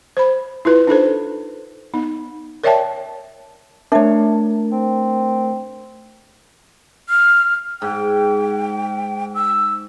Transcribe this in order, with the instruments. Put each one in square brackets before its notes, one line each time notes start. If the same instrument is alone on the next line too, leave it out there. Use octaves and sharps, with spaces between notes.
[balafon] C5 B5
E4 F4 B4
D4 D#4 A4 C5
B3 D#4
A#4 C#5 D5 E5 G5 A5
[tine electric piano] A3 A#4 [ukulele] D4 C#5 [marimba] E5
[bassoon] C4
[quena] F6
[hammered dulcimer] G#2 [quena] G5
[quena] E6